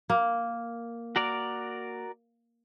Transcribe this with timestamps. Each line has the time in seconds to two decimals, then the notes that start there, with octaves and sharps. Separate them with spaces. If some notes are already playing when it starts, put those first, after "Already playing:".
0.10 A#3
1.16 F#4 A#4 D5